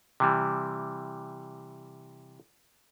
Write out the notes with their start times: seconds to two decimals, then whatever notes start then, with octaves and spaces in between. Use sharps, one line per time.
0.20 C3 E3 G3